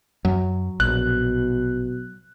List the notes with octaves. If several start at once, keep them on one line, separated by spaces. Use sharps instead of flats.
F#2 F#3
A#1 B2 F#6